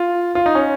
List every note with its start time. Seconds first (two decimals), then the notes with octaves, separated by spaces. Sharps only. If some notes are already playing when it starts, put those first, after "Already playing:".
Already playing: F4
0.35 F4
0.46 D#4
0.55 C#4